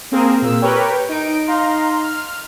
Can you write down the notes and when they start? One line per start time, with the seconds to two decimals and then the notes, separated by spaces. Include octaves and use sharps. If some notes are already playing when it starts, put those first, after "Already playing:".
0.11 A#3 C4 G#4 A#4
0.42 A#2 E6
0.62 G4 A#4 B4 C#5 G5
1.09 D#4 D7
1.47 D#4 F5 A#5 C6
2.03 F6